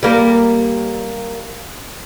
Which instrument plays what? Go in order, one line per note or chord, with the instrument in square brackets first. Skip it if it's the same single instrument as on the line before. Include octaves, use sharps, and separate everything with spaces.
[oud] G3 A#3 A#4